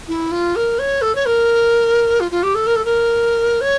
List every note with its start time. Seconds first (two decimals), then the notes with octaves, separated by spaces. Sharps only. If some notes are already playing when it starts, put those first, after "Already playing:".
0.08 E4
0.31 F4
0.55 A#4
0.78 C#5
1.01 A4
1.15 C#5
1.25 A#4
2.20 F4
2.31 F4
2.43 G4
2.54 A4
2.66 A#4
2.75 A4
2.85 A#4
3.61 C#5